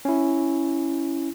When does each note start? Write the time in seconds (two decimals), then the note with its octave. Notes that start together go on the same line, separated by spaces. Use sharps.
0.05 C#4 E4